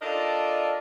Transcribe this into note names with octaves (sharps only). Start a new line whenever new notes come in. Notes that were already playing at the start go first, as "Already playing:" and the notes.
D4 F4 A4 A#4 D5 D#5